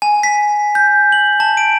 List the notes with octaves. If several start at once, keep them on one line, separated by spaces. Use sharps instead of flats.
G#5
B6
G6
F#7
A5
D7